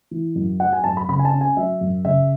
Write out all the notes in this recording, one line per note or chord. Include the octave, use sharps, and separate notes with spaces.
E3
F#2
F#3 F#5
G#5
F#2 A5
B5
C#3 B5
G#5
A5
C#4
G#5
F#3 E5
F#2
C#3 E5